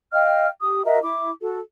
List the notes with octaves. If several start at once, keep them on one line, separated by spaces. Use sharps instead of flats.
D#5 F5 G5 F6
G4 D#6
F#4 A#4 D#5 E5
E4 D6
F#4 A4